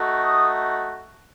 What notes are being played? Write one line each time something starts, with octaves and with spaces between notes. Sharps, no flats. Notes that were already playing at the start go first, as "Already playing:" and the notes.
Already playing: A3 D#4 F#4
D#6